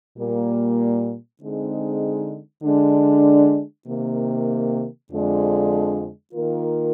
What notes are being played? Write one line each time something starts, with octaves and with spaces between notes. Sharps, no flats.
A#2 G3 A#3
D3 G#3 C4 D#4 G#4
D3 G#3 D4
C3 D#3 A#3
F2 D3 F3 G#3 D4
D#3 A#3 F4 A#4